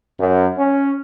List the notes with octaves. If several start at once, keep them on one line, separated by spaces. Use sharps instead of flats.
F#2
C#4